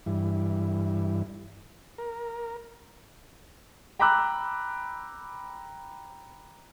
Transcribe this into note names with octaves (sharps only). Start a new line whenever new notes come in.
G2 E3
A#4
G5 A#5 B5 D6 E6 F#6